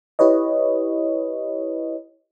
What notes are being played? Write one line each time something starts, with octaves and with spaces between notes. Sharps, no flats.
E4 G4 B4 C#5 D#5